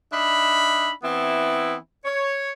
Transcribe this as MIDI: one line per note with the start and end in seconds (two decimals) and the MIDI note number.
0.13 0.90 62
0.13 0.90 63
0.13 0.90 76
0.13 0.90 83
1.03 1.76 52
1.03 1.76 59
1.03 1.76 60
1.03 1.76 64
2.05 2.51 73